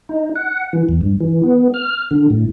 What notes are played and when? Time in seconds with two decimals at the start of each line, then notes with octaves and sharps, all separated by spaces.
0.09 D#4
0.35 F#5
0.73 E3
0.89 E2
1.01 G2
1.20 E3
1.43 B3
1.74 F6
2.11 D3
2.30 A2